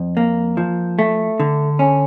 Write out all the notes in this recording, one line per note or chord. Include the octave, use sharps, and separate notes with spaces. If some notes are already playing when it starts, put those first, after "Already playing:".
Already playing: F2
A#3
F3
A3
D3
C#4